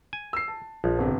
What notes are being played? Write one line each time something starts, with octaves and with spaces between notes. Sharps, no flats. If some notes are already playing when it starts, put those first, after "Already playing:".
G#5
E6 C7
A5
A#1 F3
G1 C3